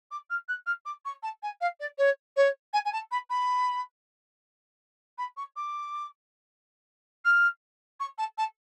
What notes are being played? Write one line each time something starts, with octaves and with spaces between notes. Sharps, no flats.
D6
F6
F#6
F6
D6
C#6
A5
G#5
F5
D5
C#5
C#5
G#5
G#5
A5
B5
B5
B5
C#6
D6
F6
C#6
A5
A5